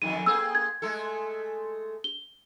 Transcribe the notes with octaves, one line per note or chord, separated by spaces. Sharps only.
F2 D3 D#3 D#7
A#3 C4 G#4 E6
G#6
G#3 A3 A4
G7